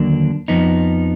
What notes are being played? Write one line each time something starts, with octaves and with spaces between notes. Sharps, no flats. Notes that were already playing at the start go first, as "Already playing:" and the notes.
Already playing: D#2 D3 F#3 A#3 D4
F2 F3 B3 D#4